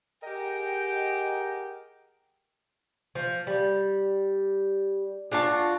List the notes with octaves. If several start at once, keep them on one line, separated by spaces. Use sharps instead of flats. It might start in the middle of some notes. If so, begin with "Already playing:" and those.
G4 G#4 A#4 D#5 F#5 G5
F3
G3
D4 F4 F#4 A5